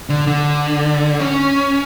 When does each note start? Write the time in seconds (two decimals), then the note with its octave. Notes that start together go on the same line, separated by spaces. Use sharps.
0.09 D3
0.27 D3
1.19 C#4